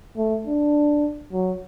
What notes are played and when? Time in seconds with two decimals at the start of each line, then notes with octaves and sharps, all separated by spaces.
0.17 A3
0.47 D4
1.33 F#3